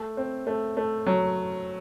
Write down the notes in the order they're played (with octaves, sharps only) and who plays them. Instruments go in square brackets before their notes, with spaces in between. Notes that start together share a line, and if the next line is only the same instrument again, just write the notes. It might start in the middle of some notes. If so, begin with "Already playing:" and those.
Already playing: [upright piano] A3
C4
A3
A3
F#3